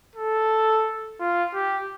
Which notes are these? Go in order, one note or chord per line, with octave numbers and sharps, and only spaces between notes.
A4
F4
G4